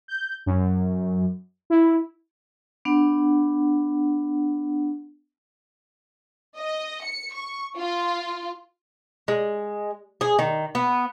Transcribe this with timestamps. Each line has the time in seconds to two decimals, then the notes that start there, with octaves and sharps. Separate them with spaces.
0.08 G6
0.46 F#2
1.70 E4
2.85 B3 D4 F#5
6.57 D#5
7.04 C#7
7.34 C#6
7.77 F4
9.28 G#3
10.21 G#4
10.39 D#3
10.75 B3